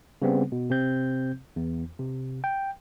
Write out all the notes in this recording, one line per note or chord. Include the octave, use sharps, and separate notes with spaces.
C#3 G3 B3 C4
B2
C3 C4 G6
E2
C3
G5